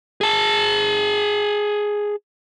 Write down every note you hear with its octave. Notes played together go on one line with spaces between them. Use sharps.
G#4 A5